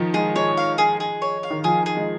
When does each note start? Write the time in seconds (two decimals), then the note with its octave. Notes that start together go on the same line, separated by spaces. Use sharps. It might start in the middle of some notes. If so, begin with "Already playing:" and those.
Already playing: D#3 F3
0.14 G#3 G#4
0.36 G#3 C#5
0.57 F5
0.78 G#4
1.00 G#4
1.22 C#5
1.43 F5
1.51 D#3
1.64 F3 G#4
1.86 G#4
1.97 G#3